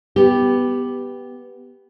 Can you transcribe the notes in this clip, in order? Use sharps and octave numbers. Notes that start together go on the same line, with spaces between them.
B3 G4